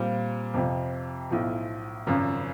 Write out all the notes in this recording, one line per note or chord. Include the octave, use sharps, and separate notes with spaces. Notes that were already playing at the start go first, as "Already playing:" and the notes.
Already playing: A#2 G3 C4 F4
F2 C3 F3
B1 A2 F3
G#1 F#2 C#3 F3